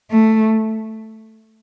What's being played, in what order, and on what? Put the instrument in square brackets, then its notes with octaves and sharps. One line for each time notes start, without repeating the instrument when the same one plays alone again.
[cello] A3